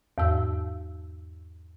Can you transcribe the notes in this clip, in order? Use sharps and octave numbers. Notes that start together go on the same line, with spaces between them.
E2 G#2 E6